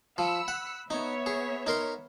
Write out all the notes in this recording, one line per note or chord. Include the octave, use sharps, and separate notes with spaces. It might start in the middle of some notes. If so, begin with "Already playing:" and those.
F3 B5 E6 C#7
F#5
B3 D#4 C#5 E5
G#4
D#4 A#4 C6